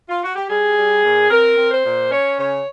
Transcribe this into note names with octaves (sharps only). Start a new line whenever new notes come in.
F4
F#4
G4
G3 G#4
G3
A#2
C4 A#4
C4
C5
A#2
C#4 C#5
C#3 C#5